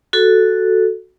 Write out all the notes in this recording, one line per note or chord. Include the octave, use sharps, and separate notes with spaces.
F#4 A4